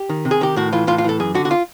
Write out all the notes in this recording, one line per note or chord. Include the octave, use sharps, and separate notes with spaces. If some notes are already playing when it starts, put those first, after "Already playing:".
Already playing: G4
D#3
C3
G#4
D#3 G4
A2 F#4
E3 F4
A2 F4
F4
E3 A4
F#2 G#4
D3 F#4
F#4
F4